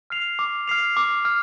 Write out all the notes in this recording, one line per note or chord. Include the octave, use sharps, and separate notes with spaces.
F6 C7 F7
D6
F6 C7 F7
D6
F6